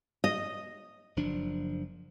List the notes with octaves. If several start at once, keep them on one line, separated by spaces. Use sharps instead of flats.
D#5
F#1 F3 D4